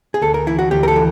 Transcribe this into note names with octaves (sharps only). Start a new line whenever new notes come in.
G#4
D2 A4
A#4
E3 E4
F#4
D2 G4
A#4
A4
E3